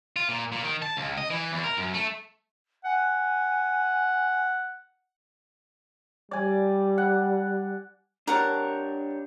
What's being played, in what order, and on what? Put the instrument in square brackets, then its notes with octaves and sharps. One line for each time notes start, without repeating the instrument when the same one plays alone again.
[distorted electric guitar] F4
A#2
A#2
D#3
A5
C#2
D#5
E3
E2
A#4
F#2
A3
[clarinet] F#5 [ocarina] G#5
[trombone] G3 [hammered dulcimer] D5 G#5
[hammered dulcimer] F#5
[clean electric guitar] D4 G4 C#5 [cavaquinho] A#4 F#5 A5